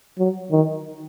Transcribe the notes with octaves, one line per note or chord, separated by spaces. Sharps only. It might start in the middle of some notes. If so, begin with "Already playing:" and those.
F#3
D#3